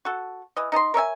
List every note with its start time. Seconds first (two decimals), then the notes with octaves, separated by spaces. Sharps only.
0.05 F#4 A4
0.57 E3 D#5
0.72 D#4 D#5 A5 C6
0.94 A#4 C#5 E5 G#5